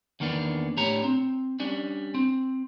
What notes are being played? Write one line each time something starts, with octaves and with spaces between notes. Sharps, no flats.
E2 D#3 A#3 B3 D4
A2 D4 G4 C#5 A#5
C4
G3 C#4 D4
C4